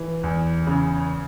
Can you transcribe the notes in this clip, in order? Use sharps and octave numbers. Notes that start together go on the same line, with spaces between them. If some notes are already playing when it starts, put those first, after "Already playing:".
Already playing: E3
E2
C#3